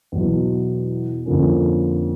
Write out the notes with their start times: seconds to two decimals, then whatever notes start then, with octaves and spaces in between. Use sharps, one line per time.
0.12 E2 B2 F#3
1.26 F2 D3 F3 A#3 C#4